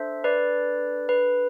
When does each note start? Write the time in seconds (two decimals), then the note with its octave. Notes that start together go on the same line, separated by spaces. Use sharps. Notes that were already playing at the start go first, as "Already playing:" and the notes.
Already playing: D4 A4 C5 E5
0.24 B4 D5
1.09 B4